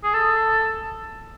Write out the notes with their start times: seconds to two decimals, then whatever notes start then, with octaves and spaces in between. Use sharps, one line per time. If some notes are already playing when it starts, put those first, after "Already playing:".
0.03 G#4
0.14 A4